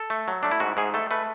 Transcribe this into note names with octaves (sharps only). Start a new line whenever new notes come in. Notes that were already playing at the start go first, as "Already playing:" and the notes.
Already playing: A4
A3
F#3
A3 D4
E4
G#2 F#4
G#2 G#4
A3 A4
A3 B4